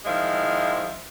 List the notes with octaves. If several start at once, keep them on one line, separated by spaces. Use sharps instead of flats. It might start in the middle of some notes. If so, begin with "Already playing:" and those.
D#3 F3 G#3 E4 F5